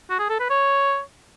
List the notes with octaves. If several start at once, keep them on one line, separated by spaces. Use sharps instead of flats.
F#4
G#4
A4
B4
C#5